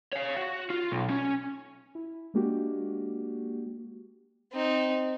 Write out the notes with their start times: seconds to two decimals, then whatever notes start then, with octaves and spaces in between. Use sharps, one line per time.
0.13 C#5 F5
0.37 F#4
0.70 F4
0.92 B1
1.10 C#4
1.95 E4
2.34 G#3 A#3 D4 F#4 G4
4.53 C4 D#4